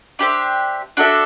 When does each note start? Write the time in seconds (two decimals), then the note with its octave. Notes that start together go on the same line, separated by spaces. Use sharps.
0.19 D4 G4 C5 E5
0.97 D4 F#4 A4 E5